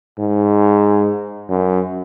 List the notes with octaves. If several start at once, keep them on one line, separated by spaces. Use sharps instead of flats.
G#2
F#2